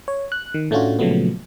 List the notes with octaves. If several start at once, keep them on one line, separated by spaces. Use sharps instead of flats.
C#5
F#6
D#3
A2 A3 C#4 D4 F4 F#4
A#2 C#3 F3 F#3 A3 B3